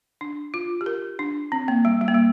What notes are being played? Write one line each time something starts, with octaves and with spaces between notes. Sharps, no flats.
D4
F4
G4
A#4
D4
C4
A#3
G3
G3
A#3
G3